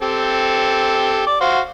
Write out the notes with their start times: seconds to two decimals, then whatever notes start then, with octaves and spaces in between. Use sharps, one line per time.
0.02 C4 G4 A4
1.27 D5 D6
1.41 F#4 C5 F5